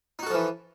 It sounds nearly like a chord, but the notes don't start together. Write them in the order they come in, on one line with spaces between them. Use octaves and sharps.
D#4 F#4 A4 F3 E3